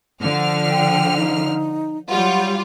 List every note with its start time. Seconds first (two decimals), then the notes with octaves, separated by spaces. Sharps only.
0.21 D3 F3 F6
0.70 G5
1.17 D#4
2.09 F#3 G3 F4 F#5